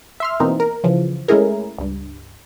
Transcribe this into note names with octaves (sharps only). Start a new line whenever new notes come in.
E5 C6 F6
B2 E3 A#3 C4 D#4
A#4
C#3 E3 F3
G#3 A3 C#4 E4 G#4 A#4
C#2 G2